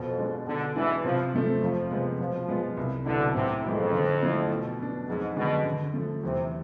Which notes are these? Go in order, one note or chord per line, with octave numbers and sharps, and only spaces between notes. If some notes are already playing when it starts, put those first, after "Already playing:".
Already playing: F2 B2
G#3 D4
B2 D3
E3 G#3 D4
C3 F3
F3 A3 C4
F2 F3
C3 G#3 B3
B2 F3
G#3 B3 F4
C2
B2 D3 B3 E4
A2 C3
F2 G#3 B3 E4
D3
F3 A3 E4
B2
B3 D4
F2 G#2
B2 D3 G#3 B3 D4
D3
F3 A3
E2 C3